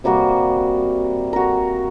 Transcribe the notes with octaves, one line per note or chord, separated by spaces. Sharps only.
C3 G3 A#3 F#4
F#4 A#4